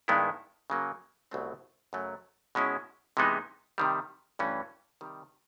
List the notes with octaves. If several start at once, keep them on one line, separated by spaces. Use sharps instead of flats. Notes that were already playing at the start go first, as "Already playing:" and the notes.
G2 D#3 G#3 B3 E4
C#3 F#3 A#3
C2 B2 F#3 A3 C4
F#2 C#3 F#3 A3
B2 G#3 C#4 E4
C3 E3 G#3 B3 D#4
C3 D#3 G3
G2 E3 A3 C#4 F#4
C3 D#3 G3